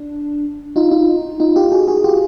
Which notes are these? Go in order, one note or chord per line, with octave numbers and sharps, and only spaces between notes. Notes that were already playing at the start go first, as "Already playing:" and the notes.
Already playing: D4
D#4 F4
D#4 F4
D#4 F4
F4 G4
F#4 G#4
F#4 G#4
F4 G4